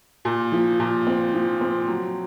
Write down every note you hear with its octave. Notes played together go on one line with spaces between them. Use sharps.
A#2
F3
A#2
C4
F3
C4
F#3